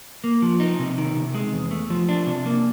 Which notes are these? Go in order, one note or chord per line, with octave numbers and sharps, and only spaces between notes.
A#3
F3
D#4
C3
D#3
C3
G#3
E2
A3
F3
D4
C3
A#3